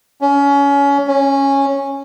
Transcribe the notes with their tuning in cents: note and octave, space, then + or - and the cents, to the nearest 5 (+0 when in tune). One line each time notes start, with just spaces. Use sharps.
C#4 +25
C#4 -10